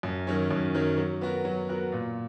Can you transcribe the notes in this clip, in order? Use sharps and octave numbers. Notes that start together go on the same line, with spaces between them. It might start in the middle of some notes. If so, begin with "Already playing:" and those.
F#2
D#3 F#3 C#4
F#2
D#3 F#3 C#4
F#3
B3 F#4 A#4
F#3
B3 F#4 A#4
A#2